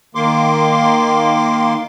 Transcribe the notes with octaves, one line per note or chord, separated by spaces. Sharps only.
D#3 A#3 C6 D6